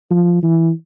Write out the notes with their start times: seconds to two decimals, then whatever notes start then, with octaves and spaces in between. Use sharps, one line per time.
0.11 F3
0.43 E3